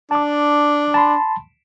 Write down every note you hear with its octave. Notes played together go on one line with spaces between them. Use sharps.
D4 A5 D6
A5 B5 C6